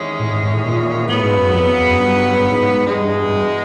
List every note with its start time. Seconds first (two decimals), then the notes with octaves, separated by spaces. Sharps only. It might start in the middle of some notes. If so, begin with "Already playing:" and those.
Already playing: E2 C3 D#3 G#3 C#4
0.20 A2
0.31 G#2
0.43 G#2
0.53 A2
0.65 A#2
1.08 A2 C#3 F#3 B3
1.23 G#2
1.37 F#2
1.53 F2
1.67 E2
1.86 F#2
1.96 G2
2.40 G2
2.51 G#2
2.62 G#2
2.73 G#2
2.84 E2 G2 B2 G#3
3.29 G2